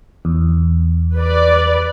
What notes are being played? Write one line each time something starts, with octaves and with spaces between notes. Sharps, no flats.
E2
B4 D5